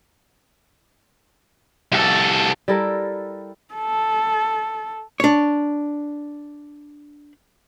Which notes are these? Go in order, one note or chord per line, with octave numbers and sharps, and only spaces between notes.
C2 A4
G3 E4 A4 A#4
A4
D4 C#5